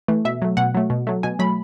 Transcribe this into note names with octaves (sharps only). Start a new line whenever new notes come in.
E3 A3
B2 E5
F#3 A3
B2 F#5
F#3 A3
B2
F#3 A3
B2 G#5
F#3 A3 B5